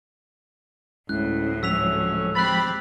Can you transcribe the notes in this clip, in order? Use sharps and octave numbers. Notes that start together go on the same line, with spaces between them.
D2 A2 G#3 C#4 E4 F#6
F3 F#3 G#3 A3 C#4 E6 B6 F7
C4 G4 B5 F#6 A6